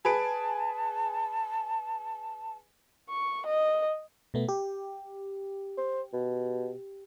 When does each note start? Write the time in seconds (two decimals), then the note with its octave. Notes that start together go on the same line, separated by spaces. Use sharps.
0.05 G#4 B4 A5 D7
3.09 C#6
3.46 D#5
4.34 B2 A3 B3
4.49 G4
5.78 C5
6.13 B2